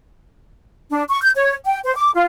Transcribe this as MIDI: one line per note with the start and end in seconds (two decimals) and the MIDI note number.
0.90 1.03 62
1.09 1.21 85
1.21 1.30 91
1.36 1.54 73
1.65 1.79 79
1.84 1.95 72
1.96 2.10 86
2.15 2.25 65